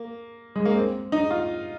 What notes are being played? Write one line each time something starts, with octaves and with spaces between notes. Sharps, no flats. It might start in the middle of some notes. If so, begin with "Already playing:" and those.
Already playing: A#3
G#3
A#3
C4
D#4
F4